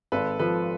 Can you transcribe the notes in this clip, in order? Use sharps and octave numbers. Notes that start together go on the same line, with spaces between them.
G#1 A4 B4
F3 A4 B4